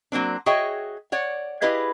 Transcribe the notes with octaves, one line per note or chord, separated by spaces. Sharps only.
F#3 A#3 C4 D4
F#4 G#4 C#5 D#5 E5 G5
C#5 D5 F#5
E4 G4 G#4 B4 D#5 F5